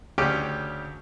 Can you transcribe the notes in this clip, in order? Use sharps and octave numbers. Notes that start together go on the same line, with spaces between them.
D2 C#3 C#4 G4 G5 D6